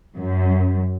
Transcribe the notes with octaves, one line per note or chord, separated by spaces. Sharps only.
F#2